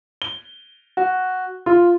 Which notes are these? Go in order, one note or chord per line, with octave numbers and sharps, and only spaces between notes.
G7
F#4
F4